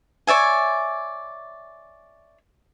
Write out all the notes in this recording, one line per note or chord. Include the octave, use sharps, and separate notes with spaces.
C#5 D5 E5 G#5